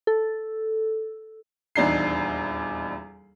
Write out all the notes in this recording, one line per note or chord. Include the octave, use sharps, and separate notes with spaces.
A4
D#1 E2 D4 D#4 C7